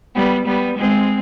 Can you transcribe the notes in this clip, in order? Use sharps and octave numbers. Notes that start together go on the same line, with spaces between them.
G3 B3
G3 B3
G#3 C4